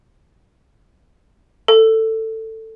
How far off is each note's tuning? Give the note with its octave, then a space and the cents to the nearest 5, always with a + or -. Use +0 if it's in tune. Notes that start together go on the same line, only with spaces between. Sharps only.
A4 +15